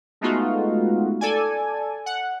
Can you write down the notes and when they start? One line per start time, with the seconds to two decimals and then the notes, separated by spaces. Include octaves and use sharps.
0.21 G#3 A3 B3 D#4 F4 F#4
1.21 A4 D5 G#5
2.06 F#5